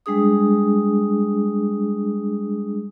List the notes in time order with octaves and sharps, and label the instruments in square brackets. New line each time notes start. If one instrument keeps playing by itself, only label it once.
[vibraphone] G3 G#3 D4 G#4 D#6